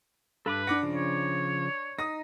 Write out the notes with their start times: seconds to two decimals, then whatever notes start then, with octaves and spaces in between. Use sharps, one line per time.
0.46 G2 A4 B4 B5 D6
0.67 D4 F#5 D6 A#6
0.83 C#3 F3
0.95 C#5
1.99 D#4 D#6 A#6